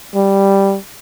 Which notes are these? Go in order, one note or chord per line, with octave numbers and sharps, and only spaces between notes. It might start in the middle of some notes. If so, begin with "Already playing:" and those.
G3